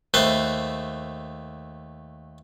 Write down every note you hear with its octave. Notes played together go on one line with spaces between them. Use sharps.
D#2 A3 B4 C5